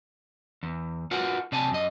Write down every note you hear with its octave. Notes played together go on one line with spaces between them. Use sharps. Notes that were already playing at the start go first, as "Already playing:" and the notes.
E2
F4 F#4 A#4 B4 F#5
C3 D5 G#5 A5
F#2 D#5